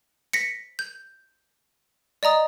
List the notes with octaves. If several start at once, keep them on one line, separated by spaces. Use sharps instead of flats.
A#6 B6 C#7
G6
D5 D#5 A#5 D#6